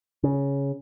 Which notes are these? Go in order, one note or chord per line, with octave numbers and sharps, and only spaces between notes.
C#3